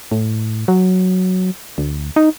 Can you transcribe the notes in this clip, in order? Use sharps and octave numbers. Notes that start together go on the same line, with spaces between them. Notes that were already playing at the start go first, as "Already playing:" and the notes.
A2
F#3
D2
D#4